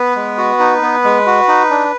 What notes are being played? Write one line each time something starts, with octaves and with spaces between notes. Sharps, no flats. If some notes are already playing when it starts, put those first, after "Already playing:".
Already playing: B3 B4
G#3
F#4
D#4
B3
G#3
F#4
D#4
D4